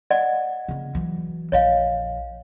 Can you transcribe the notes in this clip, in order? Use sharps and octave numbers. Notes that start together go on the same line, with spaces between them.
D5 D#5 F#5
C#3 A#3
E3 F#3
A#1 F2 C#5 D#5 F5